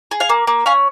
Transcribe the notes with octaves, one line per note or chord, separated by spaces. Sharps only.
G#4
F5 G#5
A#3
A#3
C#4 F5 G#5